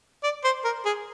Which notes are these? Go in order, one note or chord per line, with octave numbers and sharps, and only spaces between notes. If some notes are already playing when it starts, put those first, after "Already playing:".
D5
C5
A#4
G#4